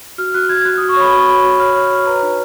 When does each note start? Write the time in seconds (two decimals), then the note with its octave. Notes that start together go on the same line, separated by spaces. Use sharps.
0.18 F#4 F6
0.34 F#4 F#6
0.49 F#4 G#6
0.65 F#4 F#6
0.77 F#4 D#6
0.89 C#6
0.96 C#5 B5
1.13 F#4 C#6
1.28 F#4 B5
1.44 F#4
1.60 C#5 F6
1.75 C#5
1.91 F#4 F6
2.06 B4 A#5
2.22 D#4